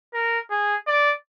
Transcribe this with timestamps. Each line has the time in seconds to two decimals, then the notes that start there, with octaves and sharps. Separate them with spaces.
0.14 A#4
0.50 G#4
0.87 D5